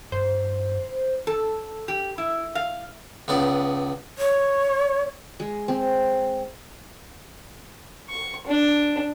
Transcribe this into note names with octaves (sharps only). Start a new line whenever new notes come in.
G2 C5
A4
G4
E4
F5
C#2 B3 D5
C#5
G#3
C4
C#6
D4